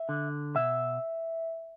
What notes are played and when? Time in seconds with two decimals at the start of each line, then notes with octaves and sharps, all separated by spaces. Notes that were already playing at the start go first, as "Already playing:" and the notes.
Already playing: E5
0.09 D3
0.55 B2 E5